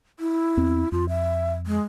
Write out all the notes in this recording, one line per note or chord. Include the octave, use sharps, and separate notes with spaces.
E4
E2 C4
F2 F4
E5
G#3